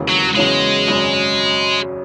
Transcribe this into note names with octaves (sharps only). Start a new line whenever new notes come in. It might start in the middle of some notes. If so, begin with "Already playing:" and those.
Already playing: E1 D#2 C#3 E3
F#3
E2 C#3 F#3 G#3 C#4 E4
G#1 F#2 C#3 F#3 C#4